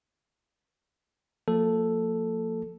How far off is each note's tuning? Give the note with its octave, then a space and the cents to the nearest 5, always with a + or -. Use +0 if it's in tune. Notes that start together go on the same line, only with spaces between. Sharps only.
F3 +20 A#3 -35 A4 +0